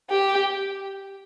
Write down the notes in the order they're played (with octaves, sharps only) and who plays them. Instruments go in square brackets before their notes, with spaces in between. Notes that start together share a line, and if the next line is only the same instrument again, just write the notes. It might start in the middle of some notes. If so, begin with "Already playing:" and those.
[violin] G4